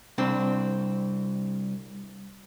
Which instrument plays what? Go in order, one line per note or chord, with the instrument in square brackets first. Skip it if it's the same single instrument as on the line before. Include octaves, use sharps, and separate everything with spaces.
[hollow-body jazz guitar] C2 C4 D4